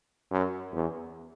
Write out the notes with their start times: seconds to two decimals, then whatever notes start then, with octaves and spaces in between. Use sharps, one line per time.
0.32 F#2
0.73 E2